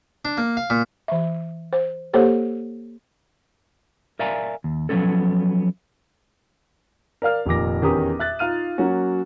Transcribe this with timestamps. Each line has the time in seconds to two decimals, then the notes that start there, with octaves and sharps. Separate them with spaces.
0.25 D4
0.37 A#3
0.57 F5
0.70 A#2
1.08 E3 E5
1.73 C5
2.14 A#3 G4 A4 C5 C#5
4.19 A#4 D5 E5 F5 G#5 A#5
4.64 D#2
4.89 F3 F#3 A3 B3 C#4 A4
7.22 A#4 D5 F5 F6
7.46 F1 A#2 D#3 D6 A#6
7.82 E2 D#3 C#4 G4 A#5 D#6
8.19 E5 F#6 A6
8.39 D#4 F4 F5 F6 D#7
8.78 F#3 A#3 C#4 F#4